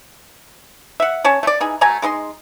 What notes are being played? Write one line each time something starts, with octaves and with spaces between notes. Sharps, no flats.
E5 F#5
C#4 C#5 A5
A3 D5
E3 D#4 G#4
F#3 A3 G#5 A#5
G#3 D#4 D#5 C6